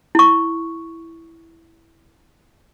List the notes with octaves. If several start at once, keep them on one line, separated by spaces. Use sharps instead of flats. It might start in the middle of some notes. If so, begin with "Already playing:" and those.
E4 C#6